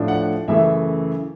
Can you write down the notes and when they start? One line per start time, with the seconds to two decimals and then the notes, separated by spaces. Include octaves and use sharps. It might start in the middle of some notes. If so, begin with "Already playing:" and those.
Already playing: A2 F3 A3 D4
0.08 F#5
0.48 F#2 C#3 E3 A3 E5